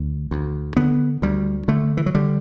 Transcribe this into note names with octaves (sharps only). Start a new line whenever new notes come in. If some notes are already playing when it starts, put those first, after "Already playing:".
Already playing: D2
D2
D3 B3
D2 G3
D3 A3
E3
F#3
D3 G3